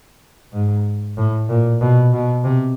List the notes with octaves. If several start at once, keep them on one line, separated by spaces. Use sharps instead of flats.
G#2
A2
A#2
B2
B2
C3